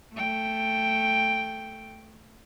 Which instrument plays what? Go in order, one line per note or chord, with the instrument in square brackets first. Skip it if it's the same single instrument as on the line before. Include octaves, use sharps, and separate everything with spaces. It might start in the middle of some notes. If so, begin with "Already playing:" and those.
[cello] A3 G5